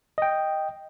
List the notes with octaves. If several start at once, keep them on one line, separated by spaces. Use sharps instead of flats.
D#5 G5